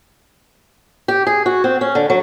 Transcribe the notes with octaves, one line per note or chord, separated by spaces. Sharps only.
G4
G#4
F#4
C4
C#4
D3
F#3